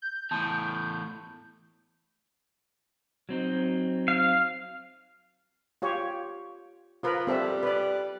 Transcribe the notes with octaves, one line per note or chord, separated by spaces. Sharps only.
G6
E2 A2 A5 C6 D#6
F#3 C4 D#4
F5
F4 G4 C#5
F3 F4 A#4 B4
G3 C4 A4 E5
B4 D5